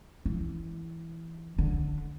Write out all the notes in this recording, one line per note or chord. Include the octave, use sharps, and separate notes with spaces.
E3
D3